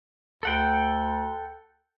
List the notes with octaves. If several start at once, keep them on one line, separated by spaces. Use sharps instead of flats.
D2 A4 F#5 G5